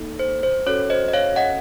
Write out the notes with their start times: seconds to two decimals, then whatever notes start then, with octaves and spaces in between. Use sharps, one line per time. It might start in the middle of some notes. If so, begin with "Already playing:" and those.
Already playing: A#3 D#4 A4
0.19 C5
0.43 C5
0.66 C#4 F#4 A4 C#5
0.90 C5 D#5
1.08 D#5
1.13 C#5 F5
1.36 D#5 F#5